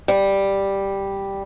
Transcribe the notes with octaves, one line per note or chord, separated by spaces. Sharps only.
G3